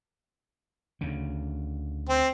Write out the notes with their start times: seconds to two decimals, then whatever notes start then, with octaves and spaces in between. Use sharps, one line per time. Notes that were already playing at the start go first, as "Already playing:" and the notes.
1.01 D2 C#3
2.09 C4